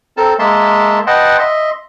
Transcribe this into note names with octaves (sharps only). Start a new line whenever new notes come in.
C4 A4 A#4 A5
G#3 A#3 E5 A5 C6
B4 D#5 F#5 G5 A5 C6
D#5 E5 C6